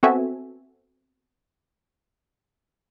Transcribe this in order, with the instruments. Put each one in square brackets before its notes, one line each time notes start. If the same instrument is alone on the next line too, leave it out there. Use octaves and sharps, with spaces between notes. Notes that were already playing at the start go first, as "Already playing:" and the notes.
[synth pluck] B3 C4 F#4 A4 E5 G#5